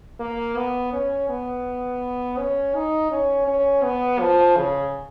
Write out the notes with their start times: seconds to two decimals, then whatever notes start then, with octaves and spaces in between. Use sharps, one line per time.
0.20 A#3
0.57 B3
0.93 C#4
1.29 B3
2.38 C#4
2.75 D#4
3.11 C#4
3.48 C#4
3.84 B3
4.20 F3
4.57 C#3